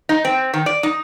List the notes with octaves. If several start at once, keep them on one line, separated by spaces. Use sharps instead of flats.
D#4
C4
D#3
D5
D#4